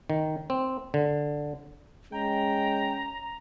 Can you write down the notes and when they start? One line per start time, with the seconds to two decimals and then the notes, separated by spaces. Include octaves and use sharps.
0.10 D#3
0.50 C4
0.94 D3
2.13 G#3 C#4 G5 A#5